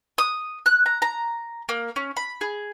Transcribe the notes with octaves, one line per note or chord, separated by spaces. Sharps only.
D#6
F#6
A#5
A#5
A#3
C#4
B5
G#4